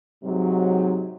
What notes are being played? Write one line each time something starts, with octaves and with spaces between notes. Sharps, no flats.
G#2 C3 F#3